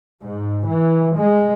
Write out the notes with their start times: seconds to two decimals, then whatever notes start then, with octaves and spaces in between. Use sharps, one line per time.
0.22 G#2
0.66 E3
1.14 G#3